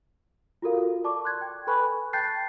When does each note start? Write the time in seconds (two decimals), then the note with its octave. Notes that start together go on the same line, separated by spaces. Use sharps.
0.62 F4 F#4 A4 A#4 F5
1.04 D5 A5 C#6 D6
1.24 C6 F#6 G#6
1.41 G5
1.67 A4 B4 G#5 B5 C#6 F#6
2.13 G5 A5 F#6 G6 A6 C7